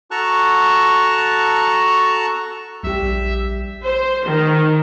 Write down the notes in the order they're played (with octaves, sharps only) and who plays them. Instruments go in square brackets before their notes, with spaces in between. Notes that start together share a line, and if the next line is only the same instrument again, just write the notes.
[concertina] F#4 A4 A5 A#5 C#6 F#6
[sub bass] A#1 [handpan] G3 G4 [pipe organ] E5
[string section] C5
D#3